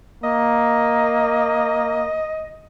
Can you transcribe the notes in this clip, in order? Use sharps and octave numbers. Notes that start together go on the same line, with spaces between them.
A#3 D#5